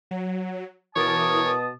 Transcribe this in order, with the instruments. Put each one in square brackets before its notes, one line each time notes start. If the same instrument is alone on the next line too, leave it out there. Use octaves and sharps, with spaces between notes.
[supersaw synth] F#3
[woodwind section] B2 A5 D#6 [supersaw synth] E3 A#4 D6 [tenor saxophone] C#5